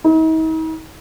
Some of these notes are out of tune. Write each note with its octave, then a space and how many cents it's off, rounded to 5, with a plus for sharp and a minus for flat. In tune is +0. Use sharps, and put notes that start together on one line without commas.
D#4 +45